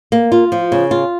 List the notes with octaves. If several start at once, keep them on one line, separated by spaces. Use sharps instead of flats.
A#3
F4
F3
C#3
F4